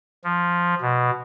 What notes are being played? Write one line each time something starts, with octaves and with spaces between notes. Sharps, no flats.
F3
B2